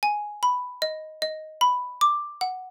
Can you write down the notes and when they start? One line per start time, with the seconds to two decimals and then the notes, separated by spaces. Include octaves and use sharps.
0.03 G#5
0.43 B5
0.82 D#5
1.22 D#5
1.61 B5
2.01 D6
2.41 F#5